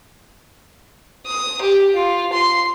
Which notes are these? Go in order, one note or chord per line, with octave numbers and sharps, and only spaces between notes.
D#6
G4
F4
C6